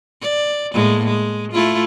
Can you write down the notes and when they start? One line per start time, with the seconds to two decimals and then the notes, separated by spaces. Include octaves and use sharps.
0.22 D5
0.73 A2 G#3 A#3
1.06 G#3
1.52 A3 E4 F4